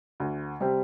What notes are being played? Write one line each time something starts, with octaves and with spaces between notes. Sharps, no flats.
D2
C3 G3 C4 G4